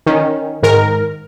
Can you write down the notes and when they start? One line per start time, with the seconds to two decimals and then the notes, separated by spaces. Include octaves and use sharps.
0.06 D#3 C#4
0.63 G#2 D#3 A#4